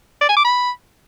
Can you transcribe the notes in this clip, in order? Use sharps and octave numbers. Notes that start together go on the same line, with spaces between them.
D5
G#5
D6
B5